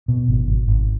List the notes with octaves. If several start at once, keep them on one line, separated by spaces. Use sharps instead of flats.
B2
G#1
G#1
G#1